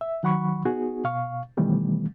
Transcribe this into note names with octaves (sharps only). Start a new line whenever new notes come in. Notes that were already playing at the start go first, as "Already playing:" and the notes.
E5
D#3 F#3 F#5 B5 C#6
B3 D#4 F#4 G#4
B2 F5 C#6
B2 D#3 E3 G3 A3 B3